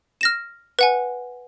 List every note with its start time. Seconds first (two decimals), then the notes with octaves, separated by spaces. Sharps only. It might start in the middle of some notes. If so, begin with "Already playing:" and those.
0.21 F6 A#6 E7
0.79 B4 F#5 G#5